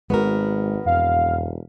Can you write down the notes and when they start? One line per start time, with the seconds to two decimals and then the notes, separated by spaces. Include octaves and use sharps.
0.10 G#1 G#3 B3 F#4 A#4
0.86 E1 F2 F5